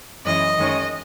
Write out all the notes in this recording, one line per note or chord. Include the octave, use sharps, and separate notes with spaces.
F#2 E3 G#3 C#4 D#5
F#2 D#3 G#3 C#4